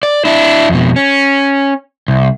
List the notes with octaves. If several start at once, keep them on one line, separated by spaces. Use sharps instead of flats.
D5
D4 E4
F2 B2
C#4
C2